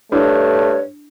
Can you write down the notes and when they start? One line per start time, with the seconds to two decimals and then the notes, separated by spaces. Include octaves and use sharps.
0.12 G2 A3 D4 E4 C#5